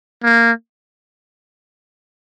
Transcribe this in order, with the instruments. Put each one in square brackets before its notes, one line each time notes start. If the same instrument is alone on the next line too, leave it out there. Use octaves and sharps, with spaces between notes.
[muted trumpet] A#3